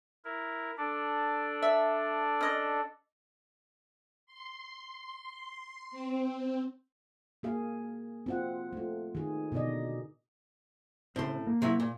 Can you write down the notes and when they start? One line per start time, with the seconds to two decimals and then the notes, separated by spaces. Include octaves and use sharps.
0.25 E4 A#4
0.78 D4 A4 D5
1.62 E5
2.41 C#4 D#5
4.26 C6
5.91 C4
6.33 C4
7.43 A#3 G#4 F5
8.26 C4 F4 F#5
8.73 A3 F4
9.15 D#3 G#4
9.52 B2 D3 D#4 D5 D#5
11.16 A2 C#3 C4 C6
11.47 A#3
11.62 C3 F#3 E4
11.80 A#2